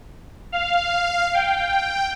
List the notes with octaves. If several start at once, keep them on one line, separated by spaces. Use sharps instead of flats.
F5
G5